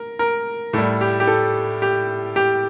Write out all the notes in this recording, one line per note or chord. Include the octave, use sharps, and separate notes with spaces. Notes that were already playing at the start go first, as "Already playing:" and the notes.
Already playing: A#4
A#4
A2 G3 A4
G4
G4
A4
G4
G4